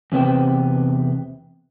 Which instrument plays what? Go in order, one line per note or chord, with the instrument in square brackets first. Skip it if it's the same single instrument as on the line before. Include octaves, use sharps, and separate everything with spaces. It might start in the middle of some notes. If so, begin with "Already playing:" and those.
[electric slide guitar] E2 C3 B3 C5 G5